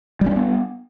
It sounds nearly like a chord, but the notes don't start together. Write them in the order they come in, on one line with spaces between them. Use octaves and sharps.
G3 C#4 D4 B3